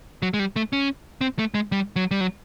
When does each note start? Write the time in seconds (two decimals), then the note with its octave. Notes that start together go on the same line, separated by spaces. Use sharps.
0.22 F#3
0.34 G#3
0.39 G3
0.56 A3
0.73 C#4
1.21 C4
1.39 A3
1.54 G#3
1.72 G3
1.96 F#3
2.11 G3
2.21 F#3